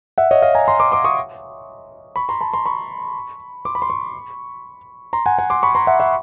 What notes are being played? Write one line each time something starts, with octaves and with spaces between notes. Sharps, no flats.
E5 F#5
C#5 D#5
D#5 F5
G#5 A#5
A#5 C6
C6 D6
C6 D6
C#6 D#6
B5 C#6
A#5 C6
A5 B5
A#5 C6
B5 C#6
C6 D6
B5
C6
B5 C#6
A#5 C6
F#5 G#5
F#5 G#5
C6 D6
B5 C#6
A#5 C6
E5 F#5
E5 F#5